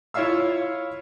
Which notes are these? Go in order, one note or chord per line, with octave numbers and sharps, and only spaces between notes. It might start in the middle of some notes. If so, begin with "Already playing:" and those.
E4 F4 C#5 E5 F5 E6